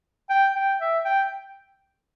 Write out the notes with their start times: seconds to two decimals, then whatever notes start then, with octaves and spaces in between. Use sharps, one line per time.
0.30 G5
0.55 G5
0.80 E5
1.05 G5